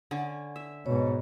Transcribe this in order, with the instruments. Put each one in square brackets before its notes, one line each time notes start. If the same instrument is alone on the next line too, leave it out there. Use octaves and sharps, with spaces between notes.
[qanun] D3 C#4
E5
[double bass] G#2 B2 [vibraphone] C#5